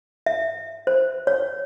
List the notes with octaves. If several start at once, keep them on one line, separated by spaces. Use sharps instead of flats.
E5
C5
C#5